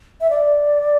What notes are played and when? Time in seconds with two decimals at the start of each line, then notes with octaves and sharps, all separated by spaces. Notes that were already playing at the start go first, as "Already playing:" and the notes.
0.21 E5
0.30 D5